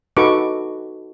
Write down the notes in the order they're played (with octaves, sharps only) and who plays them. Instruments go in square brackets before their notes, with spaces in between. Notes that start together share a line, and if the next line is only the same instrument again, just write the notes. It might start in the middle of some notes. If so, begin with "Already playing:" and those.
[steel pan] D#4 F#4 A4 B4 C#6 D6